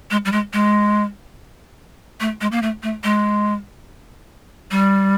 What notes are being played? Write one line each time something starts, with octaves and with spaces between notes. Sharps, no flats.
G#3
G3
G#3
G#3
A3
G#3
A#3
A3
A3
G#3
G3